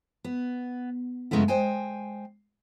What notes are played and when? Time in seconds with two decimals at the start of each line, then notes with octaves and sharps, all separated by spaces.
0.24 B3
1.31 F#2 C#3 G#3 A3 B3 E4
1.48 G#3 C5 D#5 G5 G#5